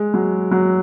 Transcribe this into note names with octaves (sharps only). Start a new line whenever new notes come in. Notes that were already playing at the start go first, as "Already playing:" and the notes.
Already playing: G#3
F#3
F#3